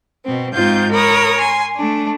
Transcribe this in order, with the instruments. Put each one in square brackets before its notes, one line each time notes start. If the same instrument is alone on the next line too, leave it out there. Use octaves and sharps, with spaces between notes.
[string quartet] B2 C4
G#2 C4 D#4 F4 G6
A#4 C#5 B5 D#6
G#5 C6
A3 D4